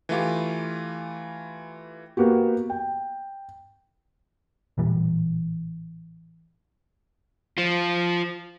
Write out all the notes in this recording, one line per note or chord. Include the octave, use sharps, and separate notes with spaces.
E3 A3 F4 G4
A#3 B3 F#4 G4
G5
A1 A#2 E3 G3
F4 C5